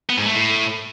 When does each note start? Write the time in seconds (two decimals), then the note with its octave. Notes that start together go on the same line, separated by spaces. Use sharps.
0.10 B3
0.18 G#2
0.26 A3
0.35 A2